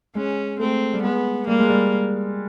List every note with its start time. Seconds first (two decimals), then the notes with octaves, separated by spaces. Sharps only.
0.15 G#3 C#4
0.59 A3 C4
0.94 G3
1.03 G#3 B3
1.47 G3 A#3
1.59 G#3
1.70 G3